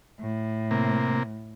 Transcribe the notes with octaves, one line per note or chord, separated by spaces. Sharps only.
A2
C3 A#3